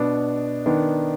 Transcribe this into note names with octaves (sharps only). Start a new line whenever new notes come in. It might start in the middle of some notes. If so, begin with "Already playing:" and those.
Already playing: B2 B3 D4
D#3 B3 D4